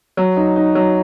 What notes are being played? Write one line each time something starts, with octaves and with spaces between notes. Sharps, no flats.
F#3
D#4
D#4
F#3